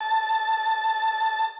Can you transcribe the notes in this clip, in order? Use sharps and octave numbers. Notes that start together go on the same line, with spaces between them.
A5